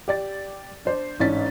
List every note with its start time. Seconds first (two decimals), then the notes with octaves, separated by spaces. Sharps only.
0.08 G4 D5 A6
0.85 D4 C5 D5
1.20 A1 G#2 C#4 D4 A6 B6